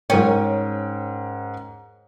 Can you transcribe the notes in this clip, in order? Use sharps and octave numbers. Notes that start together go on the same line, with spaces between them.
G#2 C#4 A#4 G5